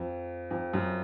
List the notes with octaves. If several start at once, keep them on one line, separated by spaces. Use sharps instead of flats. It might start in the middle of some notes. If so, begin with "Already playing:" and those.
Already playing: F2
F2
F#2